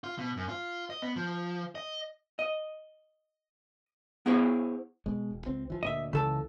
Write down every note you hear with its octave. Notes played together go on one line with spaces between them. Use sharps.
F4
B2
F#2
F4
D#5
B3
F3
D#5
D#5
B3 E4 G#4 C5 C#5
B2 G#3
E1
C#2 C4
E3 F3
D2 A#2 D#5 E5
C#2 C#3 E3 A4 A5